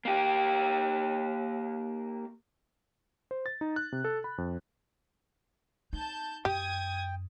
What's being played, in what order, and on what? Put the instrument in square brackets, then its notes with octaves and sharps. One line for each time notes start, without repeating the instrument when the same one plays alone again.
[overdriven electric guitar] A#3 G4
[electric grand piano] C5
A6
D#4
F#6
C3
A4
B5
F2
[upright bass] D#4 [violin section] A5 G6
[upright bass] F#2 [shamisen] G4 [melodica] G5 [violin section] D#6 G#6